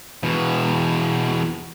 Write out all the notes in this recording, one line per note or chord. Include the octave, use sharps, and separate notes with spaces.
E2 B2